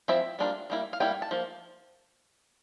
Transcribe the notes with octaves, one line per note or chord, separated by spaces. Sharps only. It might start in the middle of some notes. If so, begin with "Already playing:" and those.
F3 C4 E4 E5
G3 A#3 D4 F4
G3 A#3 E4
F5
G3 A#3 E4 G5
A5
F3 A#3